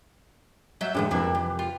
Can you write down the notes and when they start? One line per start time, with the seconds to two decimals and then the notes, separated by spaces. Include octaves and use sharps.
0.81 F#3 E5 G6
0.95 F#2 A2 D3 E3 F3 G#3 G4 F#5
1.11 F2 C3 A#3 D4 E4 G4 B4
1.35 E3
1.59 F4